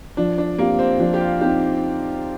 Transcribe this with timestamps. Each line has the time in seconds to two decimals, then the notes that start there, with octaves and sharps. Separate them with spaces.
0.17 F3 D4
0.38 D4
0.58 A#3 C4 G4
0.79 C4
0.99 F3 D4
1.14 G4
1.20 F4
1.41 C4 D#4 G4